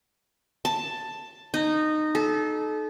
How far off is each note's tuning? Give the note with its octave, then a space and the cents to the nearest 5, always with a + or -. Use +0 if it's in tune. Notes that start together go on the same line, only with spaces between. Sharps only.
A5 +5
D#4 -15
A4 -30